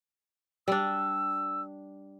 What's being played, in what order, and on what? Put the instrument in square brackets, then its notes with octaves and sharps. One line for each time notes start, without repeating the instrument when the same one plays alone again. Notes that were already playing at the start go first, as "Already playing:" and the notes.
[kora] G3 D4 [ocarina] E6